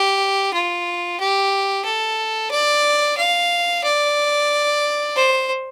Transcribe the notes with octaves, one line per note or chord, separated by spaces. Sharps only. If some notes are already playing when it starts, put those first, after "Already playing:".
Already playing: G4
F4
G4
A4
D5
F5
D5
C5